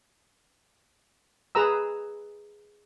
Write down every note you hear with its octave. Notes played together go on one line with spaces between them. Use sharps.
G#4 B4 A#5 E6